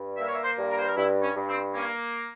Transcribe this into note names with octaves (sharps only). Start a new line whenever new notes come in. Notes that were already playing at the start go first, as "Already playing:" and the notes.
Already playing: G2
A#3 E5
C#5
E5
C5
G2
A#4
C5
A#4
G2 E4
C#4
G2
C4
A#3 C#4